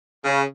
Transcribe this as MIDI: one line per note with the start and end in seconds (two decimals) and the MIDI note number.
0.24 0.43 49